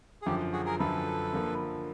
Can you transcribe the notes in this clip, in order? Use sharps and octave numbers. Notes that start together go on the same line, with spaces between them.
G#4
F#2 D3 F3 G4
F#4 G#4
G#4 A#4
F#2 D3 F3 A4 B4
D3 F3 A#3